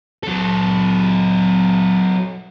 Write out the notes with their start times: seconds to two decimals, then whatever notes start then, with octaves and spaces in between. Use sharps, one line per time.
0.23 F#3 A4